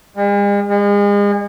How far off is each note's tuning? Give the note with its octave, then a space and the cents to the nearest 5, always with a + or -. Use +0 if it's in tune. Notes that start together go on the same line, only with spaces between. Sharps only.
G#3 -45
G#3 -35